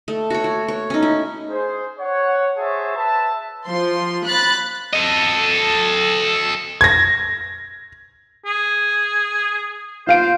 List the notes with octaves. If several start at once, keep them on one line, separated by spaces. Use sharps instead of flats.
A3
F#4 C#5
F#4
C#5
C#4 D#4
E4
G#4 C5
C#5 F#5
F#4 G#4 C5 C#5 E5 A5
B4 E5 A5
F3 C6
B5 F#6 A6
A4 D#5
G#6 A#6
G#4
F4 C5 F5 D7